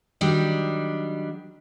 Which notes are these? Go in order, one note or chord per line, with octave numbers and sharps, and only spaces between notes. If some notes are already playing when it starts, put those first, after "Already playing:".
D#3 F#3 G3 D4